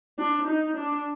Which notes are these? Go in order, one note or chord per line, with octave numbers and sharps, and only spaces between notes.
D4
D#4
D4